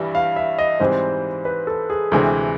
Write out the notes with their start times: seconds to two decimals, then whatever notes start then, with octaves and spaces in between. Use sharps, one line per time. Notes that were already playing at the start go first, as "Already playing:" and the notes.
Already playing: G2 E3 G3 E5
0.15 F5
0.36 E5
0.58 D#5
0.80 G#2 E3 G3 C4 C5
1.45 B4
1.67 A4
1.90 G#4
2.12 D2 C3 E3 G#3 C4